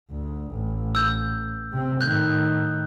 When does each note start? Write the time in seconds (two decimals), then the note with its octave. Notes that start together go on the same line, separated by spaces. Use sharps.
0.11 D2
0.52 A1
0.95 E6 G6
1.72 C3 C4
2.01 A2 D#3 F#6 G6